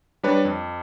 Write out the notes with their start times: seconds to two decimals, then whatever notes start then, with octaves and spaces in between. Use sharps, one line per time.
0.23 G3 D4 B4 C#5
0.45 F2